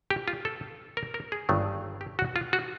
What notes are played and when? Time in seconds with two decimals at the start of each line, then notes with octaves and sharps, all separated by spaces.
0.10 G4
0.28 F4
0.45 A4
0.97 A#4
1.14 A#4
1.32 G#4
1.49 G1 G2 D#3 F#3 A3
2.01 G4
2.19 F#4
2.36 F4
2.53 F#4